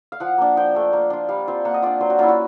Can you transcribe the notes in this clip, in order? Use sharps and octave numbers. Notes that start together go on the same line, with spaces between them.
F5
F3 F#5
A#3 D4
F3 G5
A3 D4
A#3
D4 F4
G3 F5
C4 F4
A#3 F#5
D#5
D4 F4 D5
F#3 C5
F#4
A#3 C#4 E4 F4
F#4